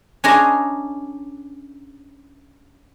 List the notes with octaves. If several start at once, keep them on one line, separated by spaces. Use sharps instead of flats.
C#4 D4 G#4 D#5 A#5 C6